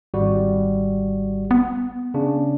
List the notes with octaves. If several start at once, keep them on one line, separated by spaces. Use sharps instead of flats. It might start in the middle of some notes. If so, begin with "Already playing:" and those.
G#1 G3 F#4
B3
C#3 D4